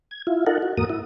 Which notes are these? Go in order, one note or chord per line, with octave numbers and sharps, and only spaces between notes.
G#6
E4 F4
D#4 F4 A4 A#4 F#5
F#4
E2 G#2 A#3 F#4 A#4 D#6
E4